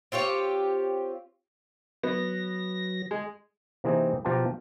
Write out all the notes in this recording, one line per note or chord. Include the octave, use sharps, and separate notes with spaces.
C4 F4 G4 C#5
F#3 B3 A#6
G#3
C3 E3 A#3 C4 D#4 G#4
B2 F3 F4 G4 A5 A#5